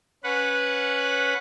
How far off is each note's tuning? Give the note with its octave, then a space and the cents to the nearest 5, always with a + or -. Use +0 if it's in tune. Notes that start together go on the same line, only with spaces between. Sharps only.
C#4 +0 B4 +0 F#5 -15